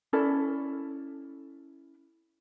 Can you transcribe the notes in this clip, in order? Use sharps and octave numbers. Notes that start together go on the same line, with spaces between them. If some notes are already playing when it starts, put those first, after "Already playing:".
C#4 E4 A4 D5